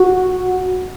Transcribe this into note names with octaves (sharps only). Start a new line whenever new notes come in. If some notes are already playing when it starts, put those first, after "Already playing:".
Already playing: F#4